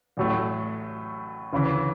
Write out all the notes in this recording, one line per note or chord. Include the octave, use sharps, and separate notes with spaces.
A1 A2 F#3 A3
D2 C#3 E3